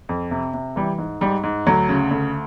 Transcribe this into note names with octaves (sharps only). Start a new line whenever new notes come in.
F2
C3
C3
E3 G3
G#2
G#2 G3
G#2
D2 F#3
C#3
D2